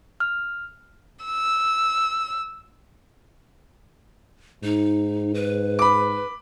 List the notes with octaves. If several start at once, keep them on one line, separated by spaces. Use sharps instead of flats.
F6
E6
G#2 D#4
B4
B5 D6